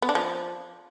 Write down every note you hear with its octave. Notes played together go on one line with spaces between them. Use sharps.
B3
D4
F3